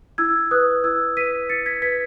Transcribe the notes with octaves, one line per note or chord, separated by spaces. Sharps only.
E4 E6 G#6
B4 D#6 F#6
E4 E6 G#6
B4 B6 D#7
E4 A6 C#7
G#6 B6
B4 G#6 B6